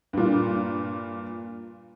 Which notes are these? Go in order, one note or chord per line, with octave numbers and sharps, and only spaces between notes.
G2 A#2